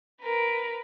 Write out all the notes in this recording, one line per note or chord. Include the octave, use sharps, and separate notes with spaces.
A#4 B4